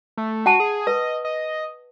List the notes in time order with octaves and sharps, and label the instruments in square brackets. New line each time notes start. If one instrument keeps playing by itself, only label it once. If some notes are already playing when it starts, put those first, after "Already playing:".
[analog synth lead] A3
[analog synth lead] F#4 [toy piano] F#5 A5
[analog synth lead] G#4
[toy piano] B4 [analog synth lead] D#5
[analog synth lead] D#5